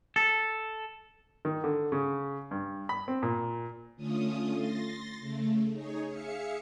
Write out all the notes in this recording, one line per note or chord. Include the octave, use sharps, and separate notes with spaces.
A4
D#3
D3
C#3
G2
B5
C4
A#2
D3 A3 C#4 F4 D#6
C6 A6 A#6
C#3 A3
D#4 G#4 C#5
G#4 E5 F5 C#7